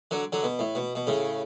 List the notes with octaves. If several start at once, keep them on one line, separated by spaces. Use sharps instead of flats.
D3 F#3
D3 F#3
B2
A2
B2
B2
A2 C#3